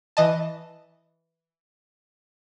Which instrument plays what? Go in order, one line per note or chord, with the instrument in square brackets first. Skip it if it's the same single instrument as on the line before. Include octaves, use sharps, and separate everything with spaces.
[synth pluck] E3 D#5 A5